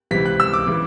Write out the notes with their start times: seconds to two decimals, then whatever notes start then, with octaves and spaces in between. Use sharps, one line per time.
0.11 C#2 C3 E3 B6
0.26 F#6
0.40 E6
0.53 D6
0.67 C#3 E3